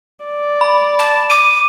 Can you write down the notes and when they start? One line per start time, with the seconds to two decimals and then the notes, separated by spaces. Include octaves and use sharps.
0.25 D5
0.61 B5
0.99 A5
1.30 D6 D#7